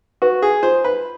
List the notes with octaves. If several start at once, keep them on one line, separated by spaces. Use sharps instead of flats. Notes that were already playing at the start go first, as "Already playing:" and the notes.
F#4 B4
G#4
F4 C5
B4